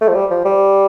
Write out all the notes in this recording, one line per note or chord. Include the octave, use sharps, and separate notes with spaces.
A3
F3
G3
F3
G3